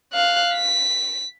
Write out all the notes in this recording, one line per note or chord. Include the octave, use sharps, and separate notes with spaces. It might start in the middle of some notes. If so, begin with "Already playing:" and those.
F5 F#6
B6